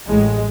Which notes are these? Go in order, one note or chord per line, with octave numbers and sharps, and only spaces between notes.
A1 A2 G#3